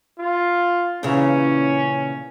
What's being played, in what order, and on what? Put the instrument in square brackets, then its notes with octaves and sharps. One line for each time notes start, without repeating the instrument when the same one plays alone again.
[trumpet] F4
[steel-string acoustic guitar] A#2 C#3 E3 [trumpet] C#4